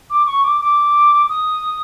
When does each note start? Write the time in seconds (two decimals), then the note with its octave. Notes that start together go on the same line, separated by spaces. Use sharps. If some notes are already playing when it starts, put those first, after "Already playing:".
0.10 D6
0.26 C#6
0.44 D6
0.61 D6
1.29 D#6